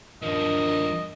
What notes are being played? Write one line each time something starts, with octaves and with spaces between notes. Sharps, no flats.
G2 F3 D4 A#4 D#5